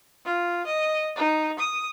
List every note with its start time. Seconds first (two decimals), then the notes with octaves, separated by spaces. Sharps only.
0.25 F4
0.66 D#5
1.16 D#4
1.59 D#6